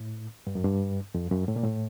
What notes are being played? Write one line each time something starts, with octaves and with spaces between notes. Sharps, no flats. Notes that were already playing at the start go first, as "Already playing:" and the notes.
Already playing: A2
G2
F#2
G2
F2
F#2
A2
A#2
A2